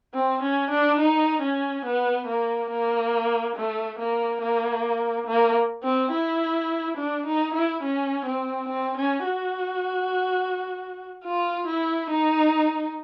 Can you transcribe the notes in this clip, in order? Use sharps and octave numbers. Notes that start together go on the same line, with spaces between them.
C4
C#4
D4
D#4
C#4
B3
A#3
A#3
A3
A#3
A#3
A#3
C4
E4
D4
D#4
E4
C#4
C4
C4
C#4
F#4
F4
E4
D#4